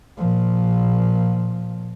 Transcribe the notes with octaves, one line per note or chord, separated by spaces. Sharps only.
A#2 F3